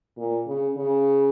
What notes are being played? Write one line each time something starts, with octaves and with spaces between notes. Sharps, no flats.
A#2
C#3
C#3